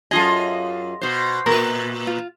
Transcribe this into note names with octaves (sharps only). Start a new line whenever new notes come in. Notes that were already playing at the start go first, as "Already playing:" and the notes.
F#2 F4 G#4 A4 D#5
B2 C5
A#2 A#4 B4
F4